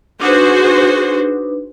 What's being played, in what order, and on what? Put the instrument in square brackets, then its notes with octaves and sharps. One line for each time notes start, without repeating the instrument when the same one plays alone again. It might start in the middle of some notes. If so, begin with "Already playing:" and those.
[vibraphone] D4 D#4 B4 [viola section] F#4 G#4 C5